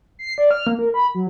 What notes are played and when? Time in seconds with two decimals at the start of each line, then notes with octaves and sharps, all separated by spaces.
0.19 C7
0.38 D5
0.51 F6
0.67 A#3
0.79 A#4
0.94 B5
1.14 F#3